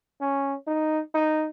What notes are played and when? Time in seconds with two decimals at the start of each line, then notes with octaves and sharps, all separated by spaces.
0.21 C#4
0.67 D#4
1.15 D#4